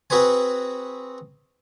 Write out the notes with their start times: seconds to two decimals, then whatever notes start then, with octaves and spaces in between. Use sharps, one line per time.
0.10 C4 F#4 G#4 B4 C5 G#5